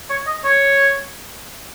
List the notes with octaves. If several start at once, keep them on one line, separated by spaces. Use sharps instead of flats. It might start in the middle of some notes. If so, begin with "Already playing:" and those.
C#5
D#5
C#5